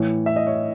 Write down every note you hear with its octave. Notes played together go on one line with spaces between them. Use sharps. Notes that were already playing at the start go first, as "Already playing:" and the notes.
Already playing: A2 E3 C#5
E5
D#5
C#5